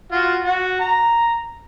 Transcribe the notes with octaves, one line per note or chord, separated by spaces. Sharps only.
F4 F#4
F#4
A#5